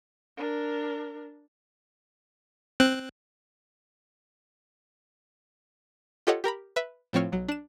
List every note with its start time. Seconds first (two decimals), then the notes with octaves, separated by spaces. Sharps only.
0.37 D4 A#4
2.80 C4 F#6
6.27 F4 G4 A4 C#5 D#5 F#5
6.44 G4 A#4 A#5 B5
6.76 B4 E5
7.13 A2 F3 C4 C#5 F6
7.32 B1 F#3
7.48 D4 E7